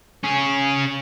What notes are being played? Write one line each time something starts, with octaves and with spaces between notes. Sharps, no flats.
C#4 G#4